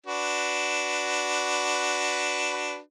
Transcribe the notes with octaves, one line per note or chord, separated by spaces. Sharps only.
D4 F#4 B4